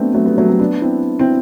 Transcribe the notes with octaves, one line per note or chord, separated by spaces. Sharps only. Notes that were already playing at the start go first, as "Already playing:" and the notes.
Already playing: A3 B3 C4 D4
F#3 A3
G3 B3
F#3 A3
A3 C4
B3 D4
C4 E4
C4 E4